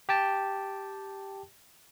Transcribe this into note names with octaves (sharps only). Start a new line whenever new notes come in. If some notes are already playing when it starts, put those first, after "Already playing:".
G4 G5 A5